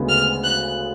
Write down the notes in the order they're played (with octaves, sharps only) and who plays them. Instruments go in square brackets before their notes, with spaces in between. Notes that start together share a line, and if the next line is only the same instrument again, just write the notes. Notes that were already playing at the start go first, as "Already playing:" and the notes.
Already playing: [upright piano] D2 C#3 G#3 B3
[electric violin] F6
F#6